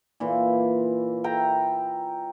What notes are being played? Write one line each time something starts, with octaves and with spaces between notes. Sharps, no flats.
A#2 E3
E5 G5 A#5